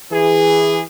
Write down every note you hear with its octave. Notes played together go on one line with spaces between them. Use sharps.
E3 G#4